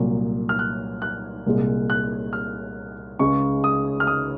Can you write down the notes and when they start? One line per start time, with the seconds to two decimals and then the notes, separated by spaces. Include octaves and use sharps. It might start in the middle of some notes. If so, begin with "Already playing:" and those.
Already playing: C2 A#2 F#3
0.49 F6
0.59 F#6
1.02 F#6
1.46 C2 A#2 G#3
1.90 F#6
2.33 F6
3.19 C#2 C#3 G#3 C#6
3.64 D#6
4.00 F6
4.07 D#6